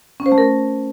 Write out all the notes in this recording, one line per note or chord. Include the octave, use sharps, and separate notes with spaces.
C#4
C5
A3
A#4